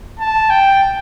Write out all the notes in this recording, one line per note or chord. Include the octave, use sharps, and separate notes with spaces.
A5
G5